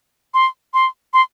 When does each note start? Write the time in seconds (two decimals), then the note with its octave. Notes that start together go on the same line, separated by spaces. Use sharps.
0.34 C6
0.74 C6
1.14 C6